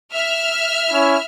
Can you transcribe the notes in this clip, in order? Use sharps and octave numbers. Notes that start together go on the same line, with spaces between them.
E5 F6
C#4 E4